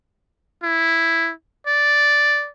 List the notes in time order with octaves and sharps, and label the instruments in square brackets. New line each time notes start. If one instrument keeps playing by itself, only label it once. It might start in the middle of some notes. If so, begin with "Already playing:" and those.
[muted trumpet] E4
D5